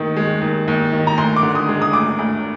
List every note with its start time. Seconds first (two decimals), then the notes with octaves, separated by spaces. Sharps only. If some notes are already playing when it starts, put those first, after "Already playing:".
Already playing: D#2 D#3
0.16 G#3
0.41 D#2
0.68 D#2
0.93 D#3
1.07 A#5
1.18 D2 C6
1.36 D6
1.43 D3
1.55 D#6
1.68 G#3
1.82 D#6
1.93 D2 D6
2.19 D2